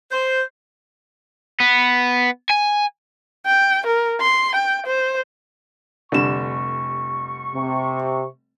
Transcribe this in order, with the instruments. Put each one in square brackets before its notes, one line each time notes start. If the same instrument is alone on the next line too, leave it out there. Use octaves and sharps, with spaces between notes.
[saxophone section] C5
[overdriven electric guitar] B3
G#5
[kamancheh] G5
A#4
C6
G5
C5
[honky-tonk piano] F1 G3 E7 [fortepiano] D3 [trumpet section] C#6
[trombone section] C3